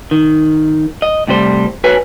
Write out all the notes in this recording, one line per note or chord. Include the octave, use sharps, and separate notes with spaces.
D#3
D#5
A2 C3 G3 C5
F#4 B4 C#5 G#5